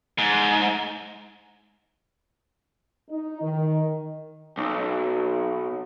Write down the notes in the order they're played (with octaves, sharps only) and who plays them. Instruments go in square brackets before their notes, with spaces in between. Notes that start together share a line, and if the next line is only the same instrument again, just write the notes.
[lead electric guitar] G#2
[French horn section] D#4
D#3
[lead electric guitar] B1